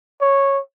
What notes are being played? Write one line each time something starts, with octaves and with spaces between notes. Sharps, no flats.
C#5